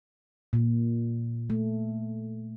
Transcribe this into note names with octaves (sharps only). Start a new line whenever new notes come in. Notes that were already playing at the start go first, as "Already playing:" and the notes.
A#2
A3